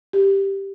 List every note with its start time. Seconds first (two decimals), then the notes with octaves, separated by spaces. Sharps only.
0.13 G4